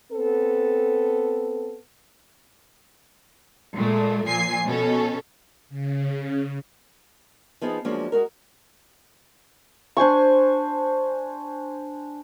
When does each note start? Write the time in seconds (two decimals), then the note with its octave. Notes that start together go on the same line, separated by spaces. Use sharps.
0.12 B3 C4 A4
3.77 A#2 G#3 A3
4.28 A#2 F3 G#5 C7
4.67 B2 C#4 A4
5.69 C#3
7.61 F3 B3 D#4 G#4
7.85 F3 F#3 G#3 A#3 C#4 D4
8.12 G#3 F#4 A#4
9.97 D4 C5 G#5 C#6